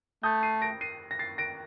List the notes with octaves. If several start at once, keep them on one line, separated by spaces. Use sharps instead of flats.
A3 D#6 G6
C7 D#7
A#6 D7
C7 D#7
A#6
A6 C7
A#6 D7